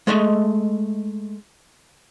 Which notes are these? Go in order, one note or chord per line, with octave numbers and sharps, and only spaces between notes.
G#3 A3 D#5 E5